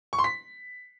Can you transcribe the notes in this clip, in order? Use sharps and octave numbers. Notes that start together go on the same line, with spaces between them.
C#6
C6
B6